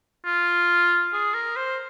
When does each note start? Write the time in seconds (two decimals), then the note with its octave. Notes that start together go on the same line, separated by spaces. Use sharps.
0.25 F4
1.13 G#4
1.34 A#4
1.56 C5